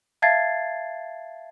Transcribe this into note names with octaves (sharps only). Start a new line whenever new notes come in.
E5 F5 A5 G#6 A6 C7